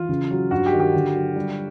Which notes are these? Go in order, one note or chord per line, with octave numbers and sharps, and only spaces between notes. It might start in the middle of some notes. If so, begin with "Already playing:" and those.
Already playing: E3 F4
C#3
F#3
G2 F#4
G4
D#3
G4
D3
F#3
G3